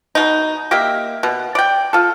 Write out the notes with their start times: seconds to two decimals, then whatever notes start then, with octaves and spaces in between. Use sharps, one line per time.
0.15 B2 D#4
0.71 A#3 G4 D#5 E5
1.23 B2
1.55 D5 G5
1.93 F4 A4